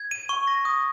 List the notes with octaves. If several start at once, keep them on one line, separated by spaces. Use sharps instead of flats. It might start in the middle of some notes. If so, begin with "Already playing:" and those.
Already playing: G#6
D#7
C#6
A#6
D#6